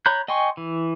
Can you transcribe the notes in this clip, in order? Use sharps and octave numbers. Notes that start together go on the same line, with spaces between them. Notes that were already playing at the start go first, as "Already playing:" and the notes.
C#5 A#5 B5 F#6 G6
D#5 G5 G#5 C6 C#6
E3